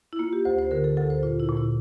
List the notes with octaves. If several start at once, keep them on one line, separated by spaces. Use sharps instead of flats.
E4
A#3 F4
G4
D2 C5
C5
D3 A#4
A4
D2 A4
C5
A#2 F4
E4
A#2
E4